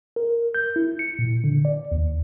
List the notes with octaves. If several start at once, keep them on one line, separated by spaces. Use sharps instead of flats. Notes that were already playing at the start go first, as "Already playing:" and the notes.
A#4
G6
E4
C#7
A#2
D3
D5
D#2